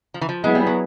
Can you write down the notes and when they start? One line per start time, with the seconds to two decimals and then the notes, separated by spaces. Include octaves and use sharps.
0.14 F3
0.21 E3
0.29 F3
0.43 F#3 G#3 B3 E4 G#4
0.55 G3
0.67 F#3